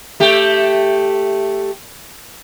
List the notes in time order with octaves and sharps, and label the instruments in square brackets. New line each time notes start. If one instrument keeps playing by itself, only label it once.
[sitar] A3 G4